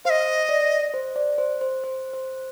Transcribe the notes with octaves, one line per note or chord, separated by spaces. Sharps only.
C5 D#5 F5
D5
C5
D5
C5
C5
C5
C5